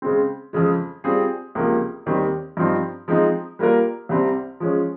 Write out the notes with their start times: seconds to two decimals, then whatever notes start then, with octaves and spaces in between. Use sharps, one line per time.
0.02 C#3 G#3 C4
0.53 F2 C#3 G#3
1.04 G3 C4 F4 G#4
1.55 C#2 C3 F3 A#3
2.06 D#2 D#3 G3 C4 G4
2.57 G2 F3 C4 D#4
3.08 F3 G#3 C4 D#4
3.59 G3 A#3 F4 A#4
4.09 C2 C3 G3 C4
4.60 F3 G#3 C#4